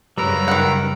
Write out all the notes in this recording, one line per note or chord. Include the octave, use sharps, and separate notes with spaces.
F#2 C#3 G3 A#4 B4 A#5 E6
D#3 F#5